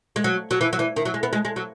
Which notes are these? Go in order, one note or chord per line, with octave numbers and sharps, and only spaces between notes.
G#3
F#3
F#3
E3
F#3
E3
D#3
F#3
G#3
B3
G#3
G#3
F#3